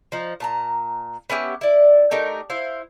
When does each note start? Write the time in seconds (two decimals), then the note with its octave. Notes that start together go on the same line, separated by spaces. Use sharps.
0.12 F3 D#4
0.40 A#2 A5 A#5
1.30 B3 C#4 E4 G4
1.61 E4 D5
2.11 A3 D#4 G4 A#4
2.50 E4 C5 F5